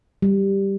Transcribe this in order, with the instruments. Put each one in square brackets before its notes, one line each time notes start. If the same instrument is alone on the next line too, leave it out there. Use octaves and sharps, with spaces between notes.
[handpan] G3